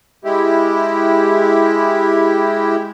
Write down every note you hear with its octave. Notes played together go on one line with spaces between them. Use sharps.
G#3 E4 G4